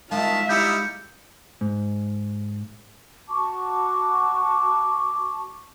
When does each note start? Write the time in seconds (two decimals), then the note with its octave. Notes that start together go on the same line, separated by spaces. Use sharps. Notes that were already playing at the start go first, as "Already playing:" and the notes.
0.11 D#3 G#3 F4 E5 F5 A5
0.49 G3 D#4 E4 G6 C#7
1.61 G#2
3.29 F#4 A5 C#6 D6